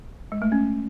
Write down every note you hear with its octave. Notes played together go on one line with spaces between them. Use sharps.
G#3
A3
C#4